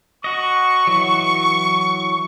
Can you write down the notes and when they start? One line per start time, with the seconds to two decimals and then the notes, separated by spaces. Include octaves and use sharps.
0.24 F#4 D#5 C#6
0.87 E3 F#3